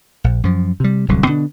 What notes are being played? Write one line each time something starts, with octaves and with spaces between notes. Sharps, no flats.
A#1
F#2 F3
C3 G3
D1 C2 D3 F#3
B2 D3 D4